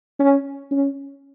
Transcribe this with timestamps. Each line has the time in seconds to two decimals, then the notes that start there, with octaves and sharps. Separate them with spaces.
0.19 C#4
0.71 C#4